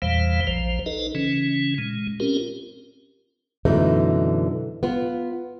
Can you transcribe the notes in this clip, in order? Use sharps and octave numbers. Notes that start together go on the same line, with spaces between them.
E2 A#2 E3 G3 C5 F5
A#1 F3 C5
D#4 A4 B4 D#5
C#3 E3 C#4
A#2 G#3
C4 C#4 F4 G4 A#4
F#2 B2 D3 E3 A3 D#4
B3 F4